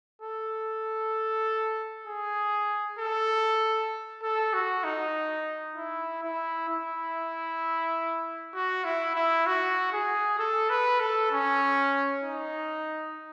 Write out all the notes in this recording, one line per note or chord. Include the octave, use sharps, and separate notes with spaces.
A4
G#4
A4
A4
F#4
D#4
E4
E4
E4
F#4
E4
E4
F#4
G#4
A4
B4
A4
C#4
D#4